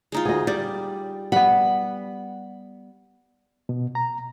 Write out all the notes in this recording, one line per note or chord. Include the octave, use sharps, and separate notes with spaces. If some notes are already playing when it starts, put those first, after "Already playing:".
G#3 D#4 F4
D2 G#4 D#5
G3 D5
G3 B3 F#5 B5
B2
A#5